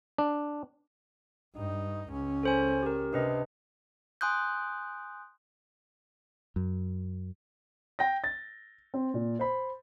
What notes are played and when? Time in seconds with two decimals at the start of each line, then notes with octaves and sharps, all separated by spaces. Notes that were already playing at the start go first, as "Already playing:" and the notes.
0.18 D4
1.56 G2 D#4
2.10 C#2 C#4
2.43 A4 C5 G#5
2.82 G4 A#4
3.13 C3 D4 B4 D#5
4.21 G#5 C6 D#6 F#6 G6
6.56 F#2
7.99 G5 A#6
8.24 A6
8.94 C4
9.14 A#2
9.39 C5 B5